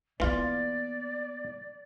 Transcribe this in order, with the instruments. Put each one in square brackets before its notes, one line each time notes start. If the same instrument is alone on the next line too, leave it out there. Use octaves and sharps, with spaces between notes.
[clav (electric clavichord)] E3 F4 [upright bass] A#3 B3 [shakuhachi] D5